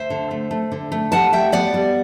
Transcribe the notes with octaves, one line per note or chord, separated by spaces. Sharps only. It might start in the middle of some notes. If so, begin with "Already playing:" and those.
Already playing: D2 C5 E5
D3
A3
A3
D3
A3
G3 F#5 A5
G3 E5 G5
B3 D5 F#5
G3